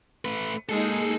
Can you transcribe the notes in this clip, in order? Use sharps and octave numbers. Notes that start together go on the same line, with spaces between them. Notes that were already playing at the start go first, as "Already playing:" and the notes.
A3 B4
G#3 A#3 D#4 G#4 A4